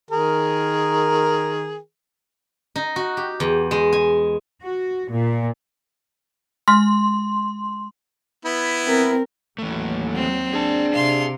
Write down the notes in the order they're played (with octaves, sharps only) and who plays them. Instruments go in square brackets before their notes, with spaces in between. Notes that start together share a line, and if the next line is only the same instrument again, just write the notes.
[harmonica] D#3 G#4 A#4
[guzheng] D#4
F#4
G4
E2
G#3
G#5
[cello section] F#4
A#2
[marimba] G#3 F6 [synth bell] C6
[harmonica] B3 E4
[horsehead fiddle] C4 A#4
[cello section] D#2 F#3 [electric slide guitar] E3 A3
[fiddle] C4
[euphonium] D4 [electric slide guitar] G#4 A5
[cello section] C3 [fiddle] F5 C6